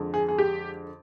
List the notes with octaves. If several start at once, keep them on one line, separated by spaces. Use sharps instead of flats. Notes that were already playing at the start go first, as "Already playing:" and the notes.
Already playing: F2 D3 G#3
G#4
G#4
G4